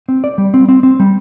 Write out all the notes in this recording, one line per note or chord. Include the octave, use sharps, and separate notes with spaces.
C4
D5
G3
C4
C4
C4
G3